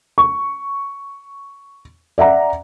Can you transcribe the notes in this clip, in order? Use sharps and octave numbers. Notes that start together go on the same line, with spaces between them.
C#6
D5 E5 F#5 A#5